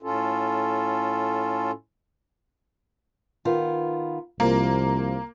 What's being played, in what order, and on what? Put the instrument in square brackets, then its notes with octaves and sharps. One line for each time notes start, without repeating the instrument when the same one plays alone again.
[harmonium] A2 C#4 F4 A4
[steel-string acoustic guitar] D#3 B3 F4
[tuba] C2 [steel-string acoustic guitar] F3 [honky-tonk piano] A#3